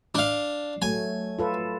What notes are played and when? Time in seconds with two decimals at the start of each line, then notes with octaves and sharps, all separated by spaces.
0.15 D4 F5
0.82 F#3 A3 G#5
1.39 F4 A4 B4